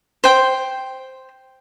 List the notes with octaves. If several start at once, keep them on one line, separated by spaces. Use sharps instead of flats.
C5 G5